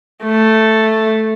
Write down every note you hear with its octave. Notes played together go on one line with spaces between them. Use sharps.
A3